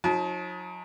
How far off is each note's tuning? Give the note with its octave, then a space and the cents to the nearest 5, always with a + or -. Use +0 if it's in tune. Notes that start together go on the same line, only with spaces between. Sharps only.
F#3 -45 D#4 +15 A5 -35